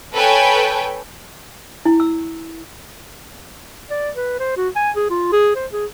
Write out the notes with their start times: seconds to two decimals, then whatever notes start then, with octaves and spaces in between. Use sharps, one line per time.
0.14 A4 B4 C#5 G5 G#5
1.85 E4
2.00 E6
3.90 D5
4.16 B4
4.40 C5
4.57 F#4
4.76 G#5
4.96 G#4
5.10 F4
5.32 G#4
5.55 C5
5.73 G#4